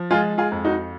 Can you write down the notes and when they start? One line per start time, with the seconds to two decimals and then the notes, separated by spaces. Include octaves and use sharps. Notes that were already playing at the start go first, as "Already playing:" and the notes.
Already playing: F3
0.11 G#3 F4 G#4
0.38 F4 G#4
0.52 F2
0.65 D#4 F#4